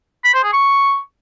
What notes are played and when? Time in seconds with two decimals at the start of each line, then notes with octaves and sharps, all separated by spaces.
0.24 B5
0.34 C5
0.43 G#4
0.53 C#6